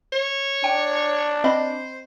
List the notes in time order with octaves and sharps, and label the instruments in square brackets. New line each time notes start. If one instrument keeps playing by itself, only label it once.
[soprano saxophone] C#5
[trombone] D4 [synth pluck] G5
[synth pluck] C4 D#5 B5 [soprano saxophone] C5